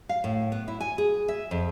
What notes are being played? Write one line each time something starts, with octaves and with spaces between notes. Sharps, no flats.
F5
A2
B3
E4
G#5
G#4
E5
F2